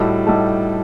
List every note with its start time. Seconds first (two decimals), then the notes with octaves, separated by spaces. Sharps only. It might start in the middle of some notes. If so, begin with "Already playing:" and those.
Already playing: A2 G3 D#4 F#4 A4
0.27 A2 G3 D#4 F#4 A4